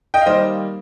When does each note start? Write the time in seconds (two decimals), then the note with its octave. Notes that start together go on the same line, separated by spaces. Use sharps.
0.14 D#5 G5
0.21 F5
0.26 D#3 G3 A#3 C5 D#5